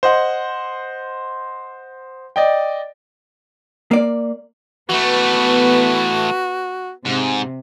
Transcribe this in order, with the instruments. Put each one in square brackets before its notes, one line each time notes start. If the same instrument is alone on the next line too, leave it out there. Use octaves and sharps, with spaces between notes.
[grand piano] C5 D#5 F#5
D5 D#5 G5
[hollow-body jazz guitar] A#3 D5
[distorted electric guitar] E3 A3 [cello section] B3 B4 [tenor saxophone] F#4
[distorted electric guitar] G#2 [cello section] C3